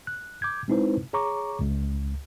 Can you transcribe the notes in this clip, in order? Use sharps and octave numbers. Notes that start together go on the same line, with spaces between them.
F#6
D6 G6 G#6
G#3 C4 D#4 E4 B4 C5
G#4 C#5 A#5 C#6 D6
C#2